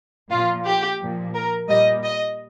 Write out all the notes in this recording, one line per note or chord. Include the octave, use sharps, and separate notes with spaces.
A#2 F3 F4
G4
A#2 F3
A#4
A#2 G3 D#5
D#5